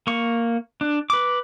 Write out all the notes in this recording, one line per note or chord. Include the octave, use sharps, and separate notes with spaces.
A#3 C#6
D4
B4 D6